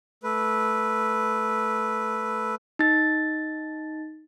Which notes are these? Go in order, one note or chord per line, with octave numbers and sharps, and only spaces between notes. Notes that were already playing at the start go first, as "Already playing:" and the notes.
A3 B4
D#4 A6